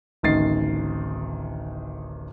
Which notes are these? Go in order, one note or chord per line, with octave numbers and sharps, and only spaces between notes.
D1 A1 D#3 A6 C7